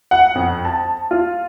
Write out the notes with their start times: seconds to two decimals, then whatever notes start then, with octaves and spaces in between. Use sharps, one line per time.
0.11 F#5
0.35 F2
0.65 A5
1.11 F4